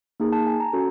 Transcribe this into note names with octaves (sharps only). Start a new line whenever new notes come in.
A#3 D#4 G#4
A5
G#5
A#5
C#4 F#4 A4